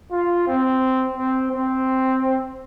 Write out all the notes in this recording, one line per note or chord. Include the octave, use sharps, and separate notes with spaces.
F4
C4
C4
C4